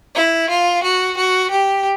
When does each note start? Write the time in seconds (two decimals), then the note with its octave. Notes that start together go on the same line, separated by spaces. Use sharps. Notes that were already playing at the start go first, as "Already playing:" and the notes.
0.15 E4
0.50 F4
0.83 F#4
1.17 F#4
1.51 G4